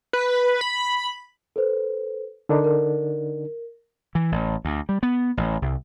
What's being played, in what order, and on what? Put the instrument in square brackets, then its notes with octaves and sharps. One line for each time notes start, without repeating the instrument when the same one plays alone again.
[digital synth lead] B4
B5
[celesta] A4 B4 C5
[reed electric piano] D3 D4 D#4 [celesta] A#4
[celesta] A#4
[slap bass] E3
A1
D2
G3
B3
A1
C2